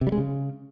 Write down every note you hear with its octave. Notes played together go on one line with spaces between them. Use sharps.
C3
G3
G#3
C#3